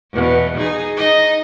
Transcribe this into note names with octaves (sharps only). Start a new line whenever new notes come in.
E2 B2
D#4 G#4
D#4 D#5